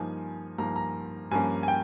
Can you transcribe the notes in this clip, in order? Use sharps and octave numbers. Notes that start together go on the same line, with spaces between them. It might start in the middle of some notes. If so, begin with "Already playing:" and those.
Already playing: G2 F3 A#3 D#4 G#5
G2 F3 A#3 D#4 A#5
A#5
G2 F3 A#3 C#4 G#5
G#5
G5